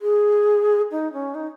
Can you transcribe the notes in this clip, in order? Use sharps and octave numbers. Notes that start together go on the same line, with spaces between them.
G#4
D#4
C#4
D#4